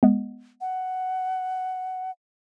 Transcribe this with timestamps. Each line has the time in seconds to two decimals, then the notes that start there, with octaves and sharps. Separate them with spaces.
0.03 G#3 B3
0.61 F#5